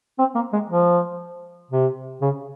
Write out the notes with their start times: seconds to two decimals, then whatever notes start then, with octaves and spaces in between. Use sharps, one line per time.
0.19 C4
0.35 A#3
0.53 G#3
0.69 F3
1.71 C3
2.21 C#3